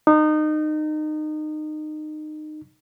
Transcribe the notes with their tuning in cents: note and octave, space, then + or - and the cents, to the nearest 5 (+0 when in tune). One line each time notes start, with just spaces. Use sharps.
D#4 -25